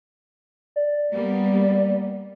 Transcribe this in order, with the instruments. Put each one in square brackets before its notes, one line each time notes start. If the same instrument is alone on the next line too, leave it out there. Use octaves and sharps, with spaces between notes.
[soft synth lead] D5
[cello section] G3 A#3 B3